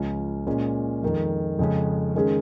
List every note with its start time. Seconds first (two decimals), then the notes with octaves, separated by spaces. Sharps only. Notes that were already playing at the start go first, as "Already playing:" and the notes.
Already playing: C#2 C#3 F3 C#4
0.47 A#2 G#3 C#4
1.03 F2 D#3 G#3
1.59 F2 C#3 G#3 C#4
2.15 D#3 G#3 C#4 G#4